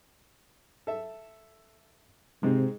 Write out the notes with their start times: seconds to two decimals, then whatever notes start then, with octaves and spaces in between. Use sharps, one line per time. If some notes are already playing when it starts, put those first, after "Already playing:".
0.87 A4 E5
2.43 G#2 C3 G#3 C4